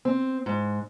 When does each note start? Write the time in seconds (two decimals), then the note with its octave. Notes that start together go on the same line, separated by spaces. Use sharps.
0.05 C4
0.46 G#2